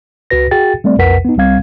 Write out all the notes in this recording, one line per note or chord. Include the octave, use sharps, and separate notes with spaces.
C#2 F#4 B4 A#6
F#4 G#4 G5 A6
G3 A3 C4 D5
B1 F2 A#4 B4 F#5 B6
B3 D#4
C2 G3 C4 F5 G#6